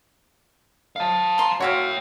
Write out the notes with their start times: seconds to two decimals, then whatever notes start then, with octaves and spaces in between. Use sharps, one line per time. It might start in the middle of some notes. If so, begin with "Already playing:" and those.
0.96 F5 A5
1.38 A#5 C6
1.60 F#4 C#5 E5 F5 G5